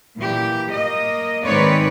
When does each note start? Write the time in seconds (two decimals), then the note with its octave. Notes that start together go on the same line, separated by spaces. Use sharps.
0.17 A#2 E3 G4
0.70 A#3 D#5
1.45 G#2 D#3 C4 B4 C#5 D5